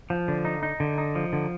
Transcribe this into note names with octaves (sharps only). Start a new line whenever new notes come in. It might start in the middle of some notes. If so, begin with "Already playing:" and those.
F3
D3
D#4
D#4
D3
D#4
F3
D3